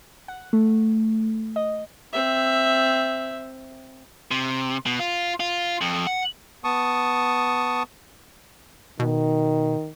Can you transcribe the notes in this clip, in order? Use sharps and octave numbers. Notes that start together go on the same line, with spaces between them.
F#5
A3
D#5
C4 E5
C3
B2
F4
F4
F2
F#5
B3 A5 C#6 D#6
B2 D#3